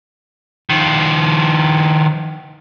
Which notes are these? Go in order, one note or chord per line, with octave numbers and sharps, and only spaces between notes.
D#3 F3